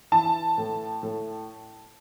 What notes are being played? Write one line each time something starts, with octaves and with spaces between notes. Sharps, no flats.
E3 A5
A2
A2